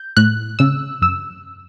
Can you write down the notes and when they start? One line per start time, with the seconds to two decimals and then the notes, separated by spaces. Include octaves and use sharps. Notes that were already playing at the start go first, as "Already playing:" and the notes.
Already playing: G6
0.17 A2 F#6
0.59 C#3 E6
1.01 F#2 E6